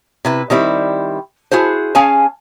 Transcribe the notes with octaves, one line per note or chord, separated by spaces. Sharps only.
C3 E4 B4
D#3 G3 C4 E4
E4 F#4 G#4 C5
C#4 G#4 F5 G#5 A5